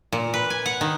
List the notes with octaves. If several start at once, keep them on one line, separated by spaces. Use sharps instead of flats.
A#2
B4
G#5
F#5
D#3